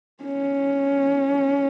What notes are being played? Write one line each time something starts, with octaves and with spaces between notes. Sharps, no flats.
C#4